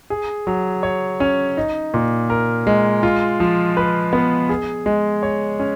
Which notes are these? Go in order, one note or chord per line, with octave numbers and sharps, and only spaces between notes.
G#4
F#3
C#5
C#4
D#4
A#2
A#4
G#3
F4
F3
B4
B3
G#4
G#3
C#5
C#4